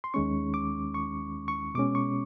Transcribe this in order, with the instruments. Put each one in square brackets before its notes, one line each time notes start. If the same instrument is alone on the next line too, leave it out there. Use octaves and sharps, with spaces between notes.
[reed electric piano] C6
D#2 D#3 G#3 C#4 C#6
D6
C#6
C#6
B2 G#3 C#4 D6
C#6